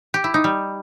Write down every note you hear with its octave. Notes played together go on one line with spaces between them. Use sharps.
G4
E4
D#4
G3